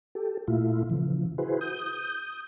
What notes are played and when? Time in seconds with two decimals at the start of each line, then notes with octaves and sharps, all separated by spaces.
0.15 G4 A4
0.48 A#2 A3 E4 F4
0.90 C#3 E3 F3
1.38 E4 F#4 G#4 B4 C5
1.61 D#6 G6